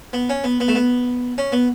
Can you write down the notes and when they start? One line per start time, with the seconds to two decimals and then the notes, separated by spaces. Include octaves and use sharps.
0.13 B3
0.30 C#4
0.44 B3
0.60 B3
0.68 A3
0.75 B3
1.38 C#4
1.52 B3